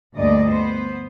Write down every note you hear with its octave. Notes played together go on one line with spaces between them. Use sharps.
D2 G2 A#2 D5 D#5
B3 C5